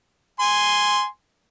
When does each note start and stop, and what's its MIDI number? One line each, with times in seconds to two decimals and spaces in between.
0.40 1.06 80
0.40 1.06 84